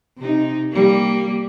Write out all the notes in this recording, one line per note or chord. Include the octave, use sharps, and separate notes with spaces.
C3 D#4
G3 A#3